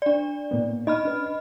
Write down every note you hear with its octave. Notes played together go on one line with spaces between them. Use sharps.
D4 D5
A2 A#3 B3
D#4 D#5 B5 F6
C#4 D4 B4